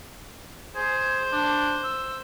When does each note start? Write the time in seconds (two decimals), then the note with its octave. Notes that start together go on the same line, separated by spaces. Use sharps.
0.75 G#4 C5
1.33 D4
1.84 E6